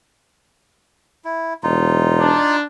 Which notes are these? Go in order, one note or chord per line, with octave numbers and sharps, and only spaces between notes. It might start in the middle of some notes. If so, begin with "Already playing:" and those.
E4
E1 D#4 F4
D4